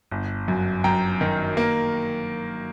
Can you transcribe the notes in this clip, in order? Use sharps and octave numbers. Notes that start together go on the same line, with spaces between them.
G1
F#2
F#2 G5 A#5
D#3
A#3